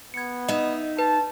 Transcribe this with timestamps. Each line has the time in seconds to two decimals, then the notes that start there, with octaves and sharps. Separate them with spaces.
0.14 B3 G#6 C#7
0.48 D#4 D#5 E5
0.99 B4 A5